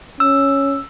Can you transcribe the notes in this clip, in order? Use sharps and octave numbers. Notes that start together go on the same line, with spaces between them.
C#4 E6